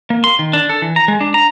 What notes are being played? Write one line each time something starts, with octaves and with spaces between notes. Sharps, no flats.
A#3
C6
D#3
D4
A4
E3
A#5
G#3
D4
A#5